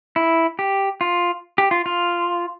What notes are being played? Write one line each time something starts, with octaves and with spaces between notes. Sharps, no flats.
E4
G4
F4
G4
F4
F4